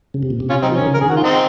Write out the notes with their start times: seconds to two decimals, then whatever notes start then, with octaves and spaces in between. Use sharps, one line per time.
0.14 C#3
0.23 C3
0.30 A#2
0.40 C3
0.50 C#4 F4
0.62 F#3 C4 D#4
0.70 F3
0.75 D#3 C#4
0.87 C#3
0.94 A#4
1.01 G#4
1.06 D#3 F#4
1.16 F4
1.24 C4 D#4